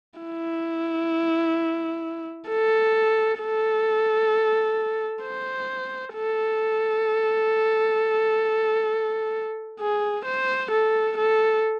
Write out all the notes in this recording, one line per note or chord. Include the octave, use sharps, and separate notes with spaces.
E4
A4
A4
C5
A4
G#4
C5
A4
A4